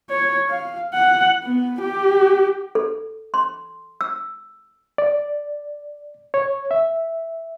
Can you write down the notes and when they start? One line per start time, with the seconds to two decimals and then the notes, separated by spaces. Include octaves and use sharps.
0.10 C#5
0.49 F5
0.94 F#5
1.43 B3
1.81 G4
2.75 A4
3.34 C6
4.01 E6
4.98 D5
6.34 C#5
6.71 E5